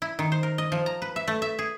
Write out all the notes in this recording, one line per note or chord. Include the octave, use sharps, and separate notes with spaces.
E4
D#3
C5
A#4
D#5
F3
A#5
B4
E5
A3
E5
G#4